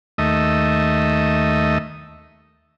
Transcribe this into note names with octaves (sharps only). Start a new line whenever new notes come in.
D#2 A3 D#5 E5